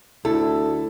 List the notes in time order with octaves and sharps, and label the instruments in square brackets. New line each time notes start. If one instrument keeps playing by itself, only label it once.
[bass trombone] D2 [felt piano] E4 [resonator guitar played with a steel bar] A4